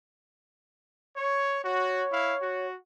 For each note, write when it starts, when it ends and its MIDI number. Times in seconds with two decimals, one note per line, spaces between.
1.15 1.60 73
1.63 2.04 66
1.63 2.67 73
2.11 2.36 64
2.11 2.36 77
2.41 2.75 66